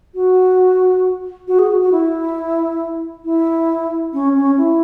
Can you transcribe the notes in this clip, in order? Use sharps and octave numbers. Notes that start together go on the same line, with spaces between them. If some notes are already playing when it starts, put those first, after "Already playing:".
F#4
F#4
G#4
F#4
F#4
E4
E4
C#4
C#4
E4